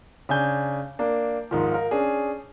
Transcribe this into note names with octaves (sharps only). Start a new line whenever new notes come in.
C#3 D4 G#5 G6
A#3 D4
G#2 D#3 F3
A#4 F5
C#4 D4 G#4